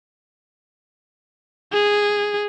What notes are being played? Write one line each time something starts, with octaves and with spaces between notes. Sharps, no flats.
G#4